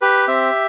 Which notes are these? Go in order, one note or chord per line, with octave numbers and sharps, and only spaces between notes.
G4 B4
C4 E5